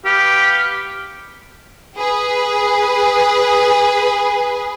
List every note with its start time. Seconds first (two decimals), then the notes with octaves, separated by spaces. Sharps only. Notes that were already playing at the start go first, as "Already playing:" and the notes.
0.05 B3 G4 F5
1.97 G#4 B4